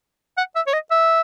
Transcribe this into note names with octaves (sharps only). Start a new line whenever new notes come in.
F#5
E5
C#5
D#5
E5